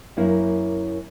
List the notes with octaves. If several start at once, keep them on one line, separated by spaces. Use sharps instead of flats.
F#2 A#3 E4